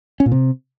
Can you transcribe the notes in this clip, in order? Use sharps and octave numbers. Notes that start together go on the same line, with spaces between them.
C#4
A#2
C3